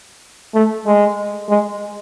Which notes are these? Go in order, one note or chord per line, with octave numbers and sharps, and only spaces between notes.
A3
G#3
G#3